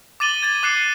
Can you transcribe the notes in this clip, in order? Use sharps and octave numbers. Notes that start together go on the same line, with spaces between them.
D6 A6 D#7 F#7 G7
G#6 A6 D#7
D6 F#6 C7 C#7 D#7